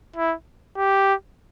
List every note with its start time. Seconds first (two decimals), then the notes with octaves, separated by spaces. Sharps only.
0.16 E4
0.77 G4